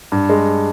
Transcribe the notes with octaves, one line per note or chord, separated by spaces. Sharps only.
G2
G#3